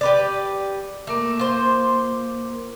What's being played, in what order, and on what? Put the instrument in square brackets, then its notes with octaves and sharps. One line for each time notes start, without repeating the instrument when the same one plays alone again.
[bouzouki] G4 B4 D5
[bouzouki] A3 [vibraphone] A#3 A#4 D6
[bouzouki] F4 C5